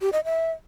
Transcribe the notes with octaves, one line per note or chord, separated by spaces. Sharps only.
G4
D#5
E5